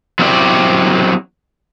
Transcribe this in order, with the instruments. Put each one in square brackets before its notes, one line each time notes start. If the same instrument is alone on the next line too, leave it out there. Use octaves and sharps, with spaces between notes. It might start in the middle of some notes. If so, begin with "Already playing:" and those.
[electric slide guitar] F#3 C4 C#4 E4 G4 D5